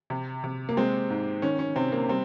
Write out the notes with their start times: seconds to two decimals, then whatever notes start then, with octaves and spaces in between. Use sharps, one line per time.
0.10 C3
0.44 C3
0.69 A#3
0.77 G#3 C4
1.10 G#2
1.42 D#3 C#4
1.59 C#4
1.76 C3 C4
1.92 A#3
2.09 G3 C4